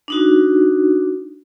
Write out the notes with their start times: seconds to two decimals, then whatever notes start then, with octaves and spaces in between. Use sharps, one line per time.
0.08 D4 D#4 F#4